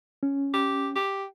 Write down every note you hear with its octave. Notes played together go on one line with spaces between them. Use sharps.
C#4
G4
G4